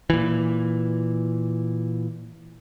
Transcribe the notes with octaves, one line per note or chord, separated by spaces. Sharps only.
A#2 E3